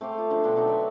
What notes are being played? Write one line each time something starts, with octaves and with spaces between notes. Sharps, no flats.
A3 C4 F5 D6
F4 F5
D3 F3 A4 B4
B2 D4 G5
F#3 A3 C4 D#4
B4 D5 E5